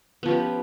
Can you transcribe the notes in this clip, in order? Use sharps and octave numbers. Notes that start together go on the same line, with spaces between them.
F3 B3 C#4 G4